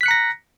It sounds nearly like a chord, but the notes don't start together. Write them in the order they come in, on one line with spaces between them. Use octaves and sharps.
B6 F#6 C#7 A#5 A#6